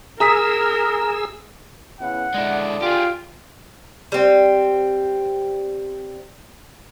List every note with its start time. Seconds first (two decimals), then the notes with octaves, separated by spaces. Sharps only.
0.20 G#4 A#4 A#5 D#6 E6 B6
2.01 C#3 B3 E4 F#5
2.34 D3 G#3 E4 A4 D5
2.82 F4 G4 G#4
4.12 G3 C4